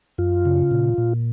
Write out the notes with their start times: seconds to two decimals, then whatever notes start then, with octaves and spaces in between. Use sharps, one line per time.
0.18 F#2 F4
0.45 C#3
0.71 A#2
0.98 A#2